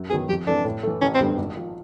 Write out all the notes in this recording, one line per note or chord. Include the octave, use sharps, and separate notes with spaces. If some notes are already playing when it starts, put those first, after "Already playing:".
Already playing: F#2
D#3 F#3 B3 G#4
F2 G4
C3 E3 A3 D4
A2
E3 A3
A1 C#4
C4
G2 D3 G3 B3
G#1
F3